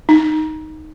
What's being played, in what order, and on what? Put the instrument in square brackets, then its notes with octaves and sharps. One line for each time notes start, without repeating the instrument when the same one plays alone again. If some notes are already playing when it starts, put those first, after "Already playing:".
[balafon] D#4